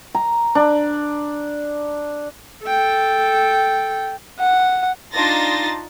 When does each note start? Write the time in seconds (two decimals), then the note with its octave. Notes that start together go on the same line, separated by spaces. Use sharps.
0.15 A#5
0.55 D4
2.65 A4 G5
4.39 F#5
5.13 D4 D#4 F4 C6 A6 A#6